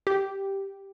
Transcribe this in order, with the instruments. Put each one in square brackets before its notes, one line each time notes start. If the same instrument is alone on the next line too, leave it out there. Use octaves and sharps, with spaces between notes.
[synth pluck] G4